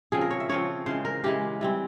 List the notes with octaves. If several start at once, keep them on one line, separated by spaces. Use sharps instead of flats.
C#3 F3 C4 G#4
A#4
C#5
E5
C#3 F3 C4 C#5
C#3 E3 G#3 C5
A#4
C#3 E3 G#3 G4
E3 G3 C4